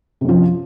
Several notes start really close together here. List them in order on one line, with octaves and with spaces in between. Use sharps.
C3 F#2 F3